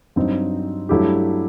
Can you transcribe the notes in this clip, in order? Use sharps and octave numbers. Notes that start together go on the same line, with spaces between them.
G2 F#3 C4 D#4
G2 F#3 A3 E4 G4